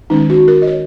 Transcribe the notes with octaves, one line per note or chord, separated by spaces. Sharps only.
D#3 G#3 C#4 D#4
F#4
A#4
D#5
C#5